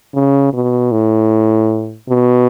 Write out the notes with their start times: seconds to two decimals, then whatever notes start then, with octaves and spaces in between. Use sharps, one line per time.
0.14 C#3
0.53 B2
0.92 A2
2.10 B2